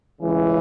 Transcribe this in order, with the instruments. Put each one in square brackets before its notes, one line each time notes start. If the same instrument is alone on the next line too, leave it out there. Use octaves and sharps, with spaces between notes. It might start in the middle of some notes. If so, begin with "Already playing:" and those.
[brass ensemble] C#2 C#3 E3